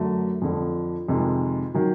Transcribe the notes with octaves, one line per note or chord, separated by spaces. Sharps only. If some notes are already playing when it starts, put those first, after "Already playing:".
Already playing: F#2 D3 F#3 A3
F2 D3 F3
F2 C3 D#3 G#3
D#3 F#3